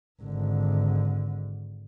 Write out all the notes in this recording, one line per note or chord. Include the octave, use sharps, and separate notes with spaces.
G#1 D3